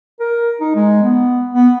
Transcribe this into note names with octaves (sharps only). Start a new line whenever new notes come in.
A#4
D#4
G#3
B3
B3